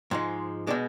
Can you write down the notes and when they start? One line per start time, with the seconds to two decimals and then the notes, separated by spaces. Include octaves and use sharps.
0.11 G#2 F3 G#3
0.67 B2 G#3 D4